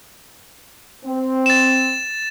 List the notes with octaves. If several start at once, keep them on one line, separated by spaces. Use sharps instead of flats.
C4
A6 E7